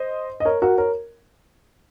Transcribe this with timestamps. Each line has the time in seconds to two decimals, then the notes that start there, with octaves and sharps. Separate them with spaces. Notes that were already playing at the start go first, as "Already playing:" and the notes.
Already playing: C5 D#5
0.40 D#5
0.45 A#4 C#5
0.62 F#4 A#4
0.78 A#4 C#5